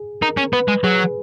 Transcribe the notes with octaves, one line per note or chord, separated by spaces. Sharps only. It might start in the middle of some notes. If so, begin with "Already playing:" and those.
Already playing: G#4
D#4 A#4
C#4
B3 B4
G#3
F#3 G#4